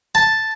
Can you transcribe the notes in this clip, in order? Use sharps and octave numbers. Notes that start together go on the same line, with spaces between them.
A5